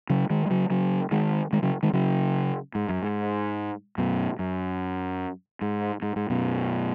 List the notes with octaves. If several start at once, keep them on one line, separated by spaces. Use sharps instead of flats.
C#3 F#3
D#3 G#3
G#3
C#3 F#3
C#3 F#3
D#3 G#3
D#3 G#3
C#3 F#3
D#3 G#3
C#3 F#3
G#2
F#2
G#2
F#2 B2
F#2
G#2
G#2
G#2
F#2 B2